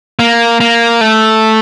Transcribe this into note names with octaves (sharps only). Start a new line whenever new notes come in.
A#3
A#3
A3